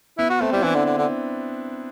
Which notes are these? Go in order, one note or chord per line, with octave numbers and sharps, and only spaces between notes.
B3 E4
F#4
A3 C4
G3 E4
E3 D4
D3
D3
D3